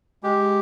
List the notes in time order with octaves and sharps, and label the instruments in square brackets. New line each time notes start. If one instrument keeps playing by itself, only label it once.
[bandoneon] G#3 G4